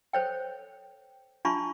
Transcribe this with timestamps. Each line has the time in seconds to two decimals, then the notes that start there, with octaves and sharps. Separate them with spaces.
0.13 A4 C5 C#5 G5
1.45 D4 F4 A5 B5 C#6